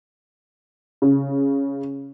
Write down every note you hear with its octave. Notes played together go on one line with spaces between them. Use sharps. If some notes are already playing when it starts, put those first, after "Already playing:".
C#3